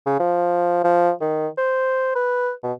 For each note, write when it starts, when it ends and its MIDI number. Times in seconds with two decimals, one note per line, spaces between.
0.06 0.20 49
0.20 0.83 53
0.84 1.12 53
1.21 1.48 51
1.58 2.11 72
2.16 2.51 71
2.63 2.73 47